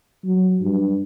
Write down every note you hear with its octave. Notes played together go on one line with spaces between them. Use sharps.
F#3
G2